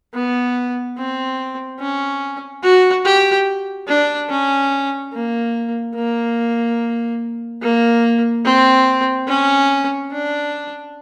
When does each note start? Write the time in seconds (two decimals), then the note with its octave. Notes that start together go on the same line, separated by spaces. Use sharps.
0.14 B3
0.98 C4
1.80 C#4
2.63 F#4
3.05 G4
3.88 D4
4.30 C#4
5.13 A#3
5.95 A#3
7.62 A#3
8.45 C4
9.28 C#4
10.12 D4